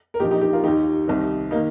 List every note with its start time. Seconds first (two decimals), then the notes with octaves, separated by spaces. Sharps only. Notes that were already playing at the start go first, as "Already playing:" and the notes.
0.14 A#4
0.20 A#2 D#4 G4
0.24 A#1
0.31 D#4 G4
0.41 D#4 G4
0.53 F4 A#4
0.64 D#2 D#3 D#4 G4
1.08 C2 C3 D#3
1.51 A#3 D#4
1.55 D#3